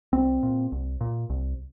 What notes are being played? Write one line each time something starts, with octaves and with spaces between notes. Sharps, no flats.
C2 C4
A#2
C2
A#2
C2